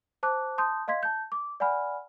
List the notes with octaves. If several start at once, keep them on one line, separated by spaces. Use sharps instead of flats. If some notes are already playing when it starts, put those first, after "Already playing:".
C5 A5 D6 F#6
A5 C6 D#6 G6
D#5 F5 C6 G#6 B6
A5 G6
D6
D5 F#5 G#5 B5 F6